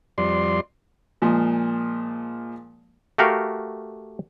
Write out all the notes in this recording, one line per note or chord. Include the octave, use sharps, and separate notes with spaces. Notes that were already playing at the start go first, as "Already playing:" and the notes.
F2 G3 D5 C6
A#2 F3 G#3
A3 F#4 G4 A#4 F5